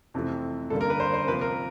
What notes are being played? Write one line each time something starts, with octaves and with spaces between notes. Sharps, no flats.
F2 C3 E3 A3
G2 D3 G3 A#3 A4
A#4
B4
C5
C5
C3 F3 A#3 B4
A#4